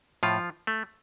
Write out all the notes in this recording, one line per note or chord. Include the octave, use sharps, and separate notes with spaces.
A2 F3 F4
A3